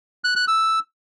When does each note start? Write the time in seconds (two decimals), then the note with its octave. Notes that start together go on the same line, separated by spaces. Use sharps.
0.24 F#6
0.36 F#6
0.48 E6